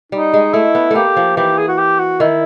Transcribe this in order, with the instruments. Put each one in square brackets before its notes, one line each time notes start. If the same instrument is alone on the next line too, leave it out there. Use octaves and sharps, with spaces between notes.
[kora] G3 [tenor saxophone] D#4
[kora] G#3
[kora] A3 [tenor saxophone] E4
[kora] B3
[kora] A3 A#3 [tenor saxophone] G4
[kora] F3
[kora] E3 [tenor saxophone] G4
[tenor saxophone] G#4
F#4
G4
F#4
[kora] D#3 [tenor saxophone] E4